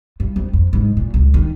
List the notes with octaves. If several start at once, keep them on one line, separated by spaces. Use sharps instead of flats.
G2
F2
F2
G#2
A#2
C#2
D#3